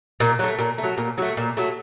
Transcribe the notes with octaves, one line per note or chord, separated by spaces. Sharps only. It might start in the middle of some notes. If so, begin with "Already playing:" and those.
A#2
F#3 A3
A#2
A3
F#3
A#2
F#3 A3
A#2
F#3 A3